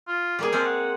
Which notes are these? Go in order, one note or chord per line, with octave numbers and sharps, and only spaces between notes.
F4
G3 A#3 G#4
F3 G#3 C4
F#5